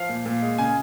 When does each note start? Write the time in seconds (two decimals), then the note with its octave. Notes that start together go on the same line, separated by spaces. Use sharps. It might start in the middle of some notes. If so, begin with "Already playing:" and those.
Already playing: F3 F5
0.09 A#2
0.26 A#2
0.42 G#3
0.58 C#3 G#5